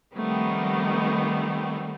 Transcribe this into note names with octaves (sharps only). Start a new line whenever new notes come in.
D#3 F3 G3 A3 B3 C4